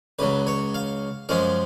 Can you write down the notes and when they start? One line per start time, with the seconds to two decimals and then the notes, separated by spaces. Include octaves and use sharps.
0.19 C#2 C#3 F#3 B4
0.47 C#5
0.74 F5
1.29 F#2 F3 G#3 C#4 F5